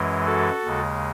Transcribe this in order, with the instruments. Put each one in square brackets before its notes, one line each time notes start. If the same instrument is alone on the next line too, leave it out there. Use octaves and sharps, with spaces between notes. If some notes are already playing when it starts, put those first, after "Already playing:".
Already playing: [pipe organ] F#2 E3 G#3
F#4 A4
D#2 C#3 G#3